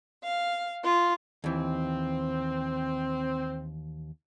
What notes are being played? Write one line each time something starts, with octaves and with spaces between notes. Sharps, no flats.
F5
F4
D#2 E3 C4